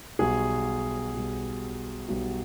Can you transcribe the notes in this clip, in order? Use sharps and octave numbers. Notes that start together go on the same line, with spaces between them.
B1 B2 G3 G#4
B1 B2 G3
B1 B2 G3